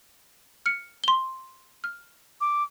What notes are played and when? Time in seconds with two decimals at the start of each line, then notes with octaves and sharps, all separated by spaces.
0.66 F6 C#7
1.04 C6 G7
1.84 F6
2.41 D6